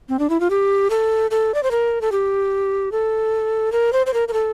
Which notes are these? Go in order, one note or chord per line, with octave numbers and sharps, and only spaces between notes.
C4
D4
E4
F4
G4
A4
A4
D5
C5
A#4
A4
G4
A4
A#4
C5
C5
A#4
A#4
A4